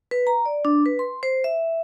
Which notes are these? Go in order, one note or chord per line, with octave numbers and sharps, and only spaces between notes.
B4
A#5
D5
D4
B4
C6
C5
E5